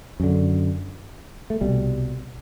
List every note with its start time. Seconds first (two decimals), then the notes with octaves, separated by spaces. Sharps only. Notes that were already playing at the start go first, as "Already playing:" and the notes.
0.20 F#2 D3
1.50 A3
1.61 C2 B2 G3